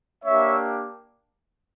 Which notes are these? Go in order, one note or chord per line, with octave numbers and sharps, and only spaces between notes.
A#3 D4 G4 C#5 E5